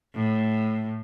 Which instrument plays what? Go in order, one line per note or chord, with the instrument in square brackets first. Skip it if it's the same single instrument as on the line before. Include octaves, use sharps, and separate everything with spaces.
[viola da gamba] A2